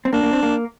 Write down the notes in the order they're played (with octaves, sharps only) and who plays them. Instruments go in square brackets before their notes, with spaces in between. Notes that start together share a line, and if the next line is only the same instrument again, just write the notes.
[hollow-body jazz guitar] C4
[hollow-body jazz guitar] A#3 [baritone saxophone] D4
[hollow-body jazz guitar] A#3
C4
A#3